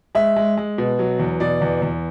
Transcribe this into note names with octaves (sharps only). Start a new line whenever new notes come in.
G#3 E5
G#3
G#3
B2
F#3
E2
B2 D5
E2
E2